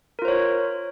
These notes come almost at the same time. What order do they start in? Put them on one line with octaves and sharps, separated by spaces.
A#4 F4 C5 C#5